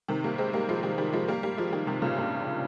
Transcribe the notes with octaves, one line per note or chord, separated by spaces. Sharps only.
C3 D#3
G3 A#3
G#3 C4
G3 A#3
F3 G#3
D#3 G3
D#3 G3
F3 G#3
G3 A#3
G3 A#3
F3 G#3
D#3 G3
C3 D#3
A#2 C#3
G2 A#2